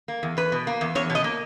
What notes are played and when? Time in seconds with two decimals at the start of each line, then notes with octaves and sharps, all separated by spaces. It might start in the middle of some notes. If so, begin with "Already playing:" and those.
0.08 A#3
0.23 E2
0.37 E2 B4
0.52 B2
0.67 A#3
0.81 E2
0.95 E2 C#5
1.10 B2
1.15 D#5
1.24 A#3